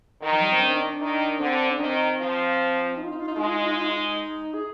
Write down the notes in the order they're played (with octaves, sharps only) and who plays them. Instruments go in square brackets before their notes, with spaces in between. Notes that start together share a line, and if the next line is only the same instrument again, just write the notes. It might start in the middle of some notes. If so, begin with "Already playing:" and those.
[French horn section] D#3
[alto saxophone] F3
G3
C4
D4
C4
D4
[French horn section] D#3
[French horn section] D3 [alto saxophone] C4
[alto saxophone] D4
[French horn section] D#3 [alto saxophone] C4
[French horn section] F3
[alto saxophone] D#4
F4
D#4
F4
D#4
[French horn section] G#3 [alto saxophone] F4
[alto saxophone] D#4
F4
D#4
F4
D#4
F4
D#4
G#4